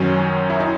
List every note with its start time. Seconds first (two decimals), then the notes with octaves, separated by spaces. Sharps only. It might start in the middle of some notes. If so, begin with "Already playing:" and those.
Already playing: F#2 D#3 F#3 C#4
0.50 E4
0.60 D#4